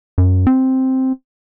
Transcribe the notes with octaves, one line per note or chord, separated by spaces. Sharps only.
F#2
C4